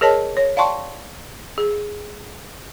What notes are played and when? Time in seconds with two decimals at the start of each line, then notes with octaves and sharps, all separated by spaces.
0.01 G#4 A#4 C#5 D#5 A5
0.37 C#5
0.56 D5 F5 G5 A5 C6 C#6
1.58 G#4